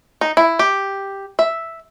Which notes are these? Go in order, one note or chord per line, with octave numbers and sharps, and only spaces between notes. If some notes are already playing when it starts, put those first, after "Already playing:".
D#4
E4
G4
E5